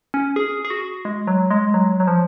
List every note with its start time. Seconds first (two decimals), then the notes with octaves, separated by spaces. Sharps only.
0.14 C#4
0.36 G#4
0.65 G#4
0.70 F#4
1.05 G#3
1.27 F#3
1.51 G#3
1.74 F#3
2.00 F#3
2.07 F3